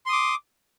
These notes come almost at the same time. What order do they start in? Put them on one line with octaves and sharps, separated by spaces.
C6 D#6 D6